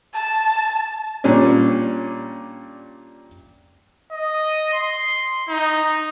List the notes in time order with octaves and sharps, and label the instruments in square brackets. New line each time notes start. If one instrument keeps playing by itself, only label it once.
[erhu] A5
[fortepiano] A#2 G3 C#4 D4
[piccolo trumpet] D#5
C6
D#4